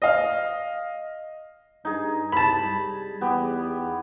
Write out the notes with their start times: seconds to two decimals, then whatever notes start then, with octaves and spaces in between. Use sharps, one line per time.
0.02 D#5 F5
1.85 G2 D#4 G#4
2.32 C2 A5 B5
2.64 G3
3.21 E2 B3 G4 G#4